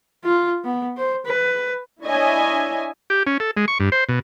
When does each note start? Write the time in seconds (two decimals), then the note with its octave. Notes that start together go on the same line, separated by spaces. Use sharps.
0.24 F4
0.64 B3
0.97 C5
1.26 B4
2.04 D4 E4 C#5 D#5 E5 G#5
3.10 G4
3.27 C#4
3.40 A4
3.57 G#3
3.68 C#6
3.80 G2
3.92 C5
4.09 B2